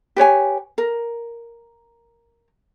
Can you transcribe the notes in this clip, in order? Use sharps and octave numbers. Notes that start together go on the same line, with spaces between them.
G4 B4 C#5 G#5
A#4